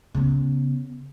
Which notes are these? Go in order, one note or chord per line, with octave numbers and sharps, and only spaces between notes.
C#3 B3